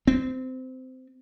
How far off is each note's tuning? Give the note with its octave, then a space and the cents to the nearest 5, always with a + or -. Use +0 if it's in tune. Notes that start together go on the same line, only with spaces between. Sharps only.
C4 -20